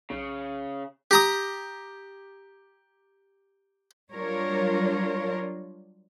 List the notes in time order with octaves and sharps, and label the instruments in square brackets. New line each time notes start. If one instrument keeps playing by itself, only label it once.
[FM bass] B1 [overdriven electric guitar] C#3
[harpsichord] G4 A#5 D#6
[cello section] F#3 G3 D4 F4 A#4 C#5